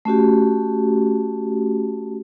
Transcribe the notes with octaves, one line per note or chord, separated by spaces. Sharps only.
A3 C#4 F#4 G4